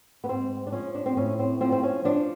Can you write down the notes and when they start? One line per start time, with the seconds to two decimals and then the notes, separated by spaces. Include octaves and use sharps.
0.24 B3
0.29 G#2 C4
0.67 D4
0.72 F3 C#4
0.95 D4
1.06 C4
1.17 A2 C#4
1.39 C4
1.61 F3 C4
1.72 C4
1.83 C#4
2.05 F3 D4